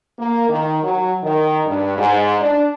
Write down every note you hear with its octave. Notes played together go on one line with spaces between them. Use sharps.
A#3
D#3
F#3
D#3
G2
G#2
D4